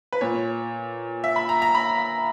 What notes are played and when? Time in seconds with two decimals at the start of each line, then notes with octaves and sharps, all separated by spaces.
0.12 B4
0.21 A#2 C#5
1.24 E5
1.36 B5
1.49 A#5
1.62 A#5
1.75 B5